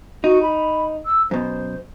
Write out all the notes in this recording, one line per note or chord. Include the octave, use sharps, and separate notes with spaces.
D#4 F#4
B5
E6
F#2 B2 C5